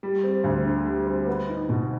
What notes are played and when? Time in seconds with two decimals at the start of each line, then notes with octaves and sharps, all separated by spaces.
0.03 G3
0.24 C4
0.44 D2
0.65 D3
0.86 G3
1.07 C4
1.27 B3
1.48 D#4
1.69 B2